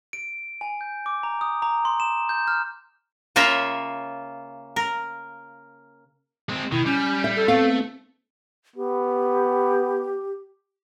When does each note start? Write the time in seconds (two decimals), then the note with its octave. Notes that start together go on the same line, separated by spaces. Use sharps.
0.13 D7
0.61 G#5
0.81 G6
1.06 D6
1.23 A#5
1.41 D#6
1.62 A#5
1.85 C6
2.00 E7
2.29 G6
2.48 F6
3.36 C#3 A#3 F4 A#4 E5
4.76 A#4
6.49 G#3 C4
6.72 B2 D#3 E4
6.86 G3 C#4 G6
7.24 E5
7.36 A4
7.48 A3 B3 C4 F5
8.76 B3 G4